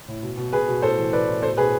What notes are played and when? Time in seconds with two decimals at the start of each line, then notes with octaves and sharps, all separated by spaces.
0.08 A2
0.23 B2
0.37 B2
0.52 B2 G#4 B4
0.68 B2
0.82 A2 A4 C5
0.98 E3
1.12 E3 B4 D5
1.27 A2
1.42 B2 A4 C5
1.57 B2 G#4 B4